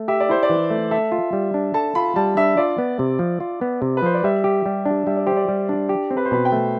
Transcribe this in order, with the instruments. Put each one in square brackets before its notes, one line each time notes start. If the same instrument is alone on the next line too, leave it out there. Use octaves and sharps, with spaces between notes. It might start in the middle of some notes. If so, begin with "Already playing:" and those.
Already playing: [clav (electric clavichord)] A3
[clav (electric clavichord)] G4 [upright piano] E5
[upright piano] D5
[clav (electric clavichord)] E4 [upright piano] C5
[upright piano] D5
[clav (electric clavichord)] E3
A3
[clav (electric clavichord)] A4 [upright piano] E5
[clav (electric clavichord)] F4
G3
D4
[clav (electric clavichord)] A4 [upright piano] A5
[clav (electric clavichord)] F4 [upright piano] B5
[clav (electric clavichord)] G3 [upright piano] A5
[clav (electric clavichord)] D4 [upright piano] E5
[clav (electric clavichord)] F4 [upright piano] D5
[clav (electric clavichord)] B3
C3
F3
F4
B3
C3
[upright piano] B4
[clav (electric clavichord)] F3 [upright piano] C5
[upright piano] D5
[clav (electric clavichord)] G3 [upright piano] E5
[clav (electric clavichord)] G4
G3
D4
[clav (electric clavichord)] G3 [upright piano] E5
[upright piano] D5
[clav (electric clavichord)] G4 [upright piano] C5
[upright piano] D5
[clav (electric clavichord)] G3
D4
G4
C4
[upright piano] B4
C5
[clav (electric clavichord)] B2 [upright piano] B4
[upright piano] G5
[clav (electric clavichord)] A3